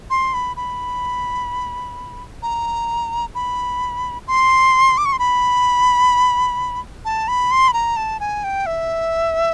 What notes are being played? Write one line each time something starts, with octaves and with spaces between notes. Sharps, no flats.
C6
B5
B5
A#5
B5
C6
D6
C#6
C6
B5
A5
B5
C6
B5
A#5
A5
G#5
G5
E5